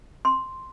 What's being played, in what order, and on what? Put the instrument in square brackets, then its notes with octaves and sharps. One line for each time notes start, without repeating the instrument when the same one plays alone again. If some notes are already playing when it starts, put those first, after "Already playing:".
[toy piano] C6